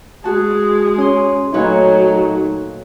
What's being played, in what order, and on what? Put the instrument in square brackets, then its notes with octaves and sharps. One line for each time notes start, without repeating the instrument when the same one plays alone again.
[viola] G#3 G#4 [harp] F#4 A5
[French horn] C#4 [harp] C6 D#6
[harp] A#2 B4 C#5 [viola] F#3 A3 [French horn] D#4